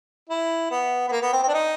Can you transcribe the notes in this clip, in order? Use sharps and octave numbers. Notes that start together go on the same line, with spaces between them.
E4
B3
B3
A#3
B3
C4
C4
D4
D#4